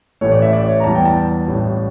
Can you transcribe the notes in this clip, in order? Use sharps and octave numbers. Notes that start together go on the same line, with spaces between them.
A1 A2 E3 A3 C#5
D5
E5
D5
C#5
A#5
E2 E3 G3 A5
G5
A5
A1 A2 G3